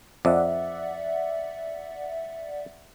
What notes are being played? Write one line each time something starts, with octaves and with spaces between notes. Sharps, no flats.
F2 D5 E5 F#5